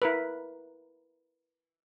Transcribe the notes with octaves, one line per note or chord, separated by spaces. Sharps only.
E4 A#4 B4